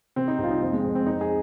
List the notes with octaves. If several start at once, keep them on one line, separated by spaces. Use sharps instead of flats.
C3 C4
D#4
C2 F4
D#4
F2 C4
G#3
F2
C4
F2 D#4
G#4